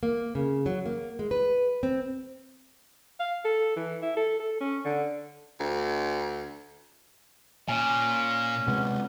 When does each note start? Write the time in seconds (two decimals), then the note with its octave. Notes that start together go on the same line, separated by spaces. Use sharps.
0.03 A#3
0.35 C#3
0.66 F#3
0.86 A#3
1.19 G#3
1.31 B4
1.83 C4
3.19 F5
3.45 A4
3.77 E3
4.02 E4
4.17 A4
4.40 A4
4.60 C#4
4.85 D3
5.60 D2
7.69 A#2 C#4 G#5
8.68 C3 G#3 B3